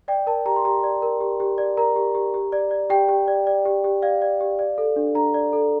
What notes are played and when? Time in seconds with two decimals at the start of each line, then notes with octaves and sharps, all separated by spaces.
0.08 D5 G5
0.27 A#4 A5
0.46 G4 A#5
0.56 C6
0.65 G4 A#5
0.83 D5
1.02 A#4
1.20 G4
1.40 G4
1.58 D5
1.77 A#4 A#5
1.96 G4
2.15 G4
2.34 G4
2.52 D5
2.71 D5
2.90 G4 G5
3.09 G4
3.28 D5
3.47 D5
3.65 G4
3.84 G4
4.02 D5 F5
4.22 D5
4.41 G4
4.59 D5
4.78 A4
4.96 D4
5.15 D4 A#5
5.34 D5
5.53 A4